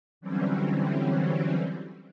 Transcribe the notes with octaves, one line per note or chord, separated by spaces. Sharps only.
D3 E3 F#3 G3 C4 C#4